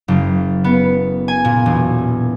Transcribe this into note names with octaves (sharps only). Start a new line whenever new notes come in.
F#1
B3
G#5
A#2
E1